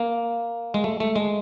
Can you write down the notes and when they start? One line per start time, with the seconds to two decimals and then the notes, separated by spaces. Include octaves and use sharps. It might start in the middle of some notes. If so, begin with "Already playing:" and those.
Already playing: A#3
0.74 G#3
0.84 A3
1.00 A3
1.16 G#3